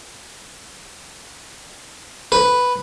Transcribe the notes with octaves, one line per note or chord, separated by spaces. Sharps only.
B4